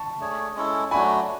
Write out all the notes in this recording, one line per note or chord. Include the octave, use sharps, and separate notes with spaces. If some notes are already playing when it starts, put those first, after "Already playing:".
Already playing: A5 C#6
A3 D4 G#4 C#5
G#3 C#4 E4 A4
F#3 A3 D4 F#4 G#5 B5